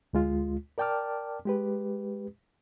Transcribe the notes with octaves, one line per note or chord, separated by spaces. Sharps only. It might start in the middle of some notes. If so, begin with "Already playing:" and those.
D2 G#3 F4
A#4 D5 G5 A5 D6 F6
G#3 G4 B4